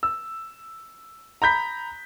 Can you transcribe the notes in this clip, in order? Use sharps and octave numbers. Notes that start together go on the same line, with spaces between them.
E6
A#5 B5 G6 B6